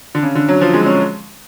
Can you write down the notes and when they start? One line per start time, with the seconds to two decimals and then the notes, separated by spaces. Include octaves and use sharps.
0.15 D3
0.23 C#3
0.35 D3
0.48 F#3
0.61 F3
0.74 G#3
0.86 C#4